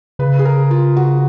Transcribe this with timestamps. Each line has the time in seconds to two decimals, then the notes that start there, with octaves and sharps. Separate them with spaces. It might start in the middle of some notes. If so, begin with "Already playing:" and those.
0.19 C#3 B4
0.39 G#4
0.45 A#4
0.71 F4
0.97 F#4